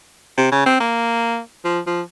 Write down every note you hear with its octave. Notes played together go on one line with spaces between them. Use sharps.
C3
C#3
C4
A#3
F3
F3